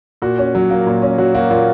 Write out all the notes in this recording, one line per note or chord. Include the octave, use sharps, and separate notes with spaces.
A#2 F#4
C#4
F#3
A#3
A#2
C#4
F#3 F#4
A#3 F#4
A#2 F4